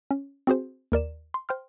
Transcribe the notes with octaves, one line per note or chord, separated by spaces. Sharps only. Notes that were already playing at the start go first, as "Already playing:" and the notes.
C#4
C4 F#4 G#4 C5
D#2 A#4 D5 E7
C6
C5 G5 C6 F6